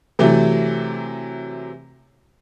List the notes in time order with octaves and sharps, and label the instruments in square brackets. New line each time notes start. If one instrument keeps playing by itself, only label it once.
[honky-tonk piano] C3 E3 F#3 A3